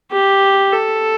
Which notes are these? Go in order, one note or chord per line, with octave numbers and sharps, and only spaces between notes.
G4
A4